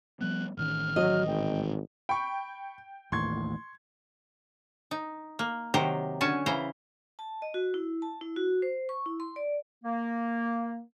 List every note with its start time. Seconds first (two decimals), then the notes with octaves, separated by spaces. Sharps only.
0.21 F3 G3 B3 F#6
0.57 A1 D#3 C#4 F6
0.96 F#3 D#5
1.27 G#1 G5
2.09 G5 B5 C#6
3.12 A1 D#2 A2 C6 C#6 G#6
4.91 D#4
5.39 A#3
5.74 C3 D#3 F#3 G4 C5 A#5
6.21 D3 C#4 F#4 G#5 A5
6.46 C#3 E3 E4 C5 A#5
7.19 A5
7.42 D#5
7.54 F#4
7.74 E4
8.02 A5
8.21 E4
8.36 F#4
8.62 C5
8.89 C#6
9.06 E4
9.20 C6
9.36 D5
9.83 A#3